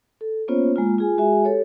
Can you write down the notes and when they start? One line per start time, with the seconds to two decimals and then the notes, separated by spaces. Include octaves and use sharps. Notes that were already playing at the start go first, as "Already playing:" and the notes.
0.21 A4
0.48 A#3 B3 C#4 F4 C5 C#5
0.76 G#3 A#3 F4
0.98 F4 G#4 G#5
1.18 G#3 F#4 G#4 E5 G#5
1.45 G4 A4 C#5